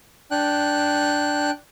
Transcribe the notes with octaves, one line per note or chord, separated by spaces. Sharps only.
D4 G5 F#6